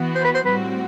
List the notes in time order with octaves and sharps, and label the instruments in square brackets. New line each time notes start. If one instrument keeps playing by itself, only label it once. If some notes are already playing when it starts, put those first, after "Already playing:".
Already playing: [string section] E3 B3 F#4
[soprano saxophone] C5
B4
C5
[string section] A2 G3 C4 F#4 [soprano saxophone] B4